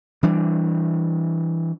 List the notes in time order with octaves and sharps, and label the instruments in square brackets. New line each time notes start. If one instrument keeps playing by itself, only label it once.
[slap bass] E3 G3 D4